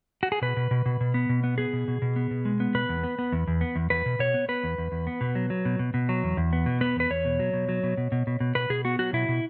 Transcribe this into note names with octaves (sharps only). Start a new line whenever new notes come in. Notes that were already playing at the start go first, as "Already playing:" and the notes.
F#4
G#4
B2 B4
B2
B2
B2
B2
B3
B2
B3
B3 G#4
B2
B2
B2
B3
B2
G#3
B3
B2 B4
E2
B3
B3
E2
E2
B3
E2
E2 B4
B2
B2 C#5
B3
B3 B4
E2
E2
E2
B3
B2
F#3
F#3
B2
B2
B2
F#3
E2
E2
B3
B2
B3 B4
E2 B4
E2 C#5
B2
F#3
B2
F#3
B2
B2
B2
B2
B2
B2 B4
B2 G#4
B3 F#4
F#3 F#4
B2 E4
B2